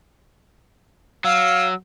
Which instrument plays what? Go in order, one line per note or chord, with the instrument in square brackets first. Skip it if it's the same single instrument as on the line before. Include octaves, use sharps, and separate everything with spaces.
[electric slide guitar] F#3 [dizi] F5 [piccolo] E6